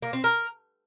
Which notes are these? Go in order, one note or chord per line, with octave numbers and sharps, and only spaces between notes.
A#3
C4
A#4